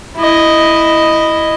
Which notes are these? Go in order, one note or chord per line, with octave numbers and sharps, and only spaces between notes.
E4 D#5